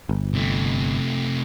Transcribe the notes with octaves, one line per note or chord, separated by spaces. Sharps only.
G1
C3 A3